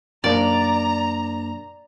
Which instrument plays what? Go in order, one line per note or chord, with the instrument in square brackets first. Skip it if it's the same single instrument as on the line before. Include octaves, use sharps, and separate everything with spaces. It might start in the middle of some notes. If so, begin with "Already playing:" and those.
[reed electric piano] F#2 A#3 D4 [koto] D5 [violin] A#5